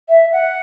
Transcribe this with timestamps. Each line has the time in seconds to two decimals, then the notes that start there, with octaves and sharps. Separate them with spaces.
0.09 E5
0.32 F#5